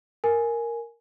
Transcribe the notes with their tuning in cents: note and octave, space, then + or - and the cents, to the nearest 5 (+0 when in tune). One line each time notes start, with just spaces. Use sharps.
A#4 +0 G#5 +5